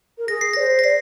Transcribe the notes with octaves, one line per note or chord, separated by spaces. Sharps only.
A#4
G#4 A#6
C7
D5 A#6
C5
A#6
D5 C7